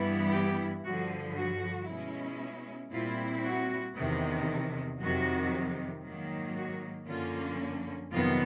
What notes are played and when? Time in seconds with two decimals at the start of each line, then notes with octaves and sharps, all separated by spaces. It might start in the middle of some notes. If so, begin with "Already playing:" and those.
Already playing: G2 E3 G3 B3 E4
0.32 G4
0.84 G2 D3 F3 F#4
1.36 F#4
1.88 B2 G#3 C#4 E4
2.92 A#2 G3 C4 E4 F4
3.44 F#4
3.96 E2 C3 D#3
5.00 F2 C3 D#3 F#3 F#4
6.04 G#2 D#3 F#3 A#3
6.57 F#4
7.08 F#2 D3 F3 A#3 C#4 F4
8.12 F2 C3 D#3 F#3 B3 F4